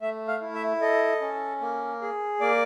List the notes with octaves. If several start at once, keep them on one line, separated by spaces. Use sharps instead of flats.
A3 E5
F5
E4
E5
A4 D#5
C#4
A#3
G#4
A#3 D5